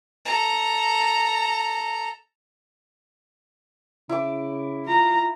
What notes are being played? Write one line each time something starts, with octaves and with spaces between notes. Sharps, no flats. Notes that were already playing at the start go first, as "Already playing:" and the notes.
A4 A#5
C#3 E4 D6
F4 A#5